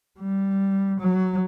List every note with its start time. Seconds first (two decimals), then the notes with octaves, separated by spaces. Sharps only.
0.19 G3
1.00 F#3